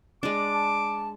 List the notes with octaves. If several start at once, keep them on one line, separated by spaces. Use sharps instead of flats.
G#3 D4 D6
A5